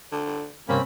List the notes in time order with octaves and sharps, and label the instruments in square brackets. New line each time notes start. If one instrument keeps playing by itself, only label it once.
[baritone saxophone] D3
[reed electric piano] G2 C3 [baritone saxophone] G3 [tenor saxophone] A#3 [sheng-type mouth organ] C4 C#4 B5